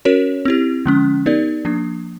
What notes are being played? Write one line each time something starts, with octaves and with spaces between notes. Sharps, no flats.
C#4 F#4 A#4 C#5
C4 E4 G4
D3 F3 G#3 C#4
B3 D#4 G4 A#4 D5
F3 A#3 D4